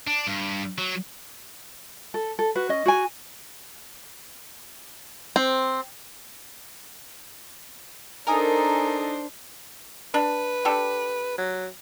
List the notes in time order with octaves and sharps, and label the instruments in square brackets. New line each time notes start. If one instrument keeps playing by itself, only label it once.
[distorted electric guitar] D4
G2
F#3
[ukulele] A4
A4
F#4 B4
C#4 D#5
F#4 G#4 G#5
[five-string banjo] C4
[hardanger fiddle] D4 C5 [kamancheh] D#4 A4 [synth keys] A#4 G#5 D#6 [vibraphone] A#5
[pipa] D4 [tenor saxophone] B4
[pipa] D4 G4 A4
[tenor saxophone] F#3